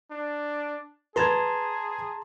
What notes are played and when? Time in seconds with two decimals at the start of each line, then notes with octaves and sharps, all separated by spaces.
0.11 D4
1.16 G#4 B4 A5 A#5 C6 G#6